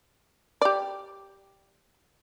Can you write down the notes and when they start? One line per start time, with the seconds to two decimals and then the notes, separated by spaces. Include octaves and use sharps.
0.61 G4 D5